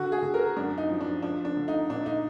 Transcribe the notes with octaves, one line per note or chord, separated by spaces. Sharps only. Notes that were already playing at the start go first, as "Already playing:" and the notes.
Already playing: D3 F#4
G#4
D3
A#4
F#2 D4
D#4
F3
D4
F3 D4
D4
D3
D#4
A#2 D4
D#4